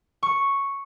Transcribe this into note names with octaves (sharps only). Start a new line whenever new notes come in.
C#6